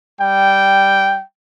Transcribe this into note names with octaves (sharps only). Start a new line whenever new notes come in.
G3 G5